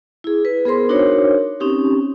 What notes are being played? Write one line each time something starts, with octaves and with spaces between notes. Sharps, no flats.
E4 G#4
B4
B3 G#4 A#4 C5 C6
D4 D#4 F#4 A#4 C5 C#5
C4 C#4 D#4 G4